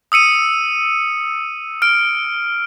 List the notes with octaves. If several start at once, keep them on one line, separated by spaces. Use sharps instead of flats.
D#6 E6 C#7 D#7
F6 D7